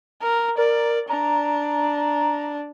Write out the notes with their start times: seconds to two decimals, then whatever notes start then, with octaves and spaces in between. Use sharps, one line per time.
0.22 A#4
0.58 A#4 D5
1.09 D4 A#5